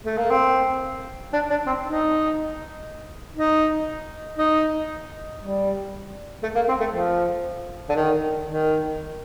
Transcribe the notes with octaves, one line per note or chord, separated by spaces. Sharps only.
A3
A#3
C4
D4
D4
C4
D#4
D#4
D#4
G3
A3
A#3
C4
A3
F3
D3
D#3
D#3